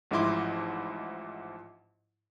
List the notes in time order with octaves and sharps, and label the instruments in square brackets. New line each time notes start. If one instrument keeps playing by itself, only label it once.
[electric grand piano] A1 G#2 F3 E4 C6 D6